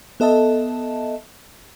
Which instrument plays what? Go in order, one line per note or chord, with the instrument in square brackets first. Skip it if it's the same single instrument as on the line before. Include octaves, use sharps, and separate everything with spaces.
[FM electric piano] B3 A4 D#5 E5 A5